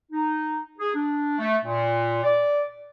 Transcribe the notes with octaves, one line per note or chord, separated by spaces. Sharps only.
D#4
G#4
D4
A3
A#2
D5